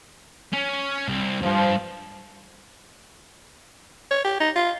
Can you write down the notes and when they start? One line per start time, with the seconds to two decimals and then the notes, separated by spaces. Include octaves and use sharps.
0.53 C#4
1.08 C2
1.42 C2 G2 F3
4.11 C#5
4.24 G4
4.40 D#4
4.56 F4